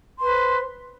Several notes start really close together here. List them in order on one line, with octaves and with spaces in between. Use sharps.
C6 B4 C5